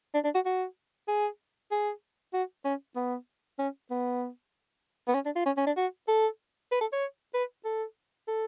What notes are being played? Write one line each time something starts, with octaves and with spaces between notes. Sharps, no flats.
D4
D4
F#4
F#4
G#4
G#4
F#4
C#4
B3
C#4
B3
B3
C#4
D4
F4
C#4
C#4
D4
F#4
A4
B4
A4
C#5
B4
A4
A4